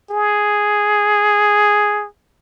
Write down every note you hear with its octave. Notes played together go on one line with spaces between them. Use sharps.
G#4